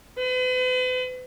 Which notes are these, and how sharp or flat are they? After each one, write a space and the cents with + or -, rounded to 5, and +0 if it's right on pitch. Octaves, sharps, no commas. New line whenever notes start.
B4 +45